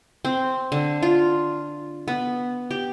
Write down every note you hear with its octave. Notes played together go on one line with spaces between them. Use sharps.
C4
D3
F4
B3
G4